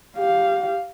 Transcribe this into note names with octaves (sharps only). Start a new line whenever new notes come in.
G4 F5